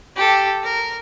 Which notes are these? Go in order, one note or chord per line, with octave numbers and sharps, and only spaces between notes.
G4 A4
A#4